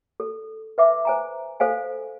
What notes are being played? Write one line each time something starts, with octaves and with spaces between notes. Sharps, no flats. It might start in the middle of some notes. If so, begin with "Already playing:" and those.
A4
B4 E5 D6
C5 G#5 A#5
A4 C5 F5 G#5